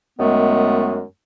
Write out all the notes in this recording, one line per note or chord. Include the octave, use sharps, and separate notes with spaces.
F#2 D#3 G#3 A3 B3